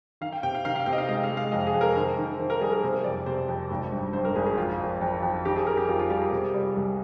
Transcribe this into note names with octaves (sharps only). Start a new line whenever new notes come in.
D#3 F5
G5
C3 G5
F5
D#3 F5
F5
C3 G5
D#5
F5
G#3 D#5
F5
G#3
F5
F2 D#5
G#4
F2
A#4
D#3 C5
D#3
D#3 C5
A#4
G3 G#4
A#4
C3 C5
F2 D5
C3 C5
F2
G#1
G2
G2 C5
A#4
G#1 G#4
G#4
F2 F4
F2
F2
F2
D#3 G4
G#4
F2 A#4
G4
F2 F4
F4
G3 G4
G#4
C3
G3
C2